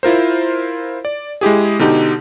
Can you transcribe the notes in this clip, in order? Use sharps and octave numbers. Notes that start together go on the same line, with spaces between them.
E4 F4 A#4 C5
D5
G#3 E4 G4 G#4
B2 D3 D#4 G4